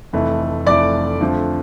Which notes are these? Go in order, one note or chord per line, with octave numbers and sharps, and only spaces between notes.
F1 F2 E3 A3
F1 F2 E3 A3 D5 D6
F2 D3 F3 A3